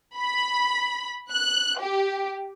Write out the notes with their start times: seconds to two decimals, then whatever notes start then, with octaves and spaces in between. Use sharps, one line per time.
0.17 B5
1.32 F#6
1.80 G4